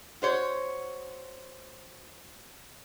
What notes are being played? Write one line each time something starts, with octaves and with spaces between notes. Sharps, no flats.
F#4 C5 C#5